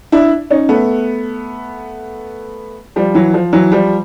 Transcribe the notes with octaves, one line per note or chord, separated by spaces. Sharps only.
D4 E4
C#4 D#4
A3 B3
F3 G3
E3 F#3
F3
E3 F#3
F3 G3